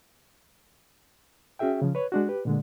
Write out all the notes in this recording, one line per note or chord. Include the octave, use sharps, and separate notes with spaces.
C#4 F#4 G#4 E5 G5
C#3 F3
B4 C#5
G#3 D4 F#4
G4 B4
A#2 D3 G#3